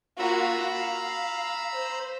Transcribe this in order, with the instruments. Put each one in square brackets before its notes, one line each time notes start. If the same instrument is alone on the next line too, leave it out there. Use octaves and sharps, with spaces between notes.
[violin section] A#3 F4 F#4 [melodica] A#5 B5 E6
[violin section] F5
C5